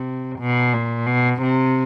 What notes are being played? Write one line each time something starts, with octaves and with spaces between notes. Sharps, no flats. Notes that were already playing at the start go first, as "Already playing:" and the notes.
Already playing: C3
B2
A#2
B2
C3